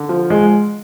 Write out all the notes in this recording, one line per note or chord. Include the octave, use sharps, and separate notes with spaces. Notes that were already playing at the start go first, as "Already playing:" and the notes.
Already playing: D3
F3
G#3